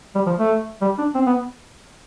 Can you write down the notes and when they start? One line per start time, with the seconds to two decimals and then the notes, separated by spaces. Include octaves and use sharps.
0.15 G3
0.26 F3
0.38 A3
0.81 G3
0.99 D4
1.15 C4
1.27 B3